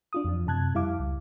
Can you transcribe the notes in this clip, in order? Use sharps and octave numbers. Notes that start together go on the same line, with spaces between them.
D4 F4 D#6
F2 F3
F#2 C3 A5 F#6 G#6
F2 G3 E4 F5 D6
C#2